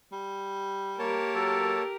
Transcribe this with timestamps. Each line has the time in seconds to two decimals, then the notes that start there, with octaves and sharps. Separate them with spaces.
0.12 G3
0.99 A#3 G4 A#4 C#5 A5
1.35 F#3 A4